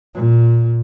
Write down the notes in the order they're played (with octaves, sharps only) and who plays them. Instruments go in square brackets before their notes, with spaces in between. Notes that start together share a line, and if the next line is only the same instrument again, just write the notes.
[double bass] A#2